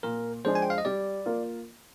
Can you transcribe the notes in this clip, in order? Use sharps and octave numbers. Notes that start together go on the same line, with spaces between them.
A#2 A#4
F3 G#3 D4 G#4 C5
G#5
G5
F5
D#5
G3 D5
A#3 F4 A#4